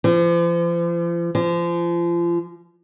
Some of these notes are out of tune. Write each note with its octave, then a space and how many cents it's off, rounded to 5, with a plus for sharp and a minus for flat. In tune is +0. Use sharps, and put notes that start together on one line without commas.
F3 -40
F3 -30